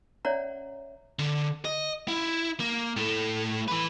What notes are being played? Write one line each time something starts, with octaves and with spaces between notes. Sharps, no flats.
C#4 C#5 D5 E5 F#5 A#5
D3
D#5
E4
A#3
A2 A3
E3 B4